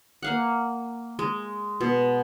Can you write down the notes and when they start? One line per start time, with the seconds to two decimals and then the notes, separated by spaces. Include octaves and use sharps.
0.23 A#3 F5 F#5
1.19 G#3
1.81 B2